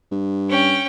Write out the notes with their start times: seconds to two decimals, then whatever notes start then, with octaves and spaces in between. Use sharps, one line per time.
0.12 G2
0.49 C#4 G5